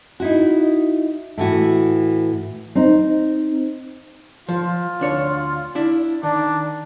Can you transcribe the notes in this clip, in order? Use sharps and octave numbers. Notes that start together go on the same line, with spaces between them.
D#4 E4 F#4
A2 E3 F#4
C4 D#4
F3 F4
D2 D4 C#5
D4 E4
D#3 D4